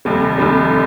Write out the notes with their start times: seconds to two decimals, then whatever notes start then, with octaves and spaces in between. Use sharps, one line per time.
0.05 F1 D#2 D3 G3
0.38 F1 D#2 D3 G3